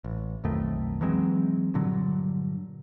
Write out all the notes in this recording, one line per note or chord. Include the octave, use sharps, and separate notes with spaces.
A1
B1 F2 D#3 A3
E3 F#3 G#3 C4
G2 A#2 D3 F#3